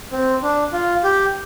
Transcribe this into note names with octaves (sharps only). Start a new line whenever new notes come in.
C4
D4
F4
G4